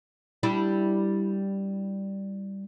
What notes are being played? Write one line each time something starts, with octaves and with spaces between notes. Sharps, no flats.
G3 D4 E4